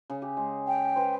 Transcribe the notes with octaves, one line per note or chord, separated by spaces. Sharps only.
C#3
G4
G#3
F5 G5
B4 C5